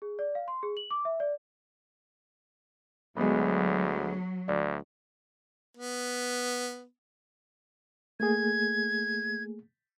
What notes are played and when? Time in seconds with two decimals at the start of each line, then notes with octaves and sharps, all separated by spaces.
0.02 G#4
0.19 D5
0.35 F5
0.48 C6
0.63 G#4
0.77 F#7
0.91 D6
1.05 E5
1.20 D5
3.17 D2 F#3 G#3 B3
4.48 D2 D5
5.77 B3
8.20 A3 A#3 G#4 G#6